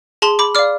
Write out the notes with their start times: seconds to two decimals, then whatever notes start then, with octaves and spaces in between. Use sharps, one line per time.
0.22 G#4 A5 C6
0.39 B5 D6
0.55 D5 F5 D6 F6